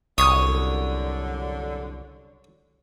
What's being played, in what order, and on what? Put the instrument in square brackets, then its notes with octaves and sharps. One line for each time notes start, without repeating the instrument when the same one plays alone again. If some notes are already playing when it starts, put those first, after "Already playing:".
[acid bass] C2 [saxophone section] F#2 D3 [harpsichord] C#5 [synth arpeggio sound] D#6